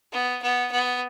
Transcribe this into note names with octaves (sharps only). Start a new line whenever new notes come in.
B3
B3
B3